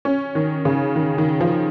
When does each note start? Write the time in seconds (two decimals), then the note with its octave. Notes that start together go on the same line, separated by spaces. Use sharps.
0.05 C#4
0.35 D#3
0.65 C#3
0.96 D#3
1.18 D#3
1.40 F3